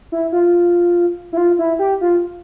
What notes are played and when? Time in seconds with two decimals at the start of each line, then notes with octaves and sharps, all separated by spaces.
0.12 E4
0.32 F4
1.33 E4
1.37 F4
1.59 E4
1.79 G4
2.01 F4